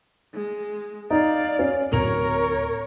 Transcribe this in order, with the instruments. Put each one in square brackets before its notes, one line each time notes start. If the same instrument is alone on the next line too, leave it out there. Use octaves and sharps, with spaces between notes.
[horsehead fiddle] G#3
[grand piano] D#4 [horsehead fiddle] D5 F5
[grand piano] C#4
[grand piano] D1 F7 [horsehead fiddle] A#4 C#5